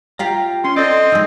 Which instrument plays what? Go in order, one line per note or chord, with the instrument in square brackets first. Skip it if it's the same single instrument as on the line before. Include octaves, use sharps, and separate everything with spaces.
[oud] F4 G4 F5 [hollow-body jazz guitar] A#5
[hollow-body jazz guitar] C#4 [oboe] C6
[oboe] C4 [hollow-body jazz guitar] A4 D5 [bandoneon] D#5
[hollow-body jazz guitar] F2 [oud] G#3 D#4